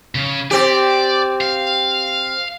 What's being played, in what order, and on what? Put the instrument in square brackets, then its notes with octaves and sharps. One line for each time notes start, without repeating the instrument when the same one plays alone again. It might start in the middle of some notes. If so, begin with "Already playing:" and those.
[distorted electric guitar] C#3
[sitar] C4 G4 [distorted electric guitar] D5
[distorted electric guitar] F5